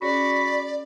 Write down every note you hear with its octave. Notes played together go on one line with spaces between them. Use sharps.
C#4 F#4 G#4 C#5 D5 B5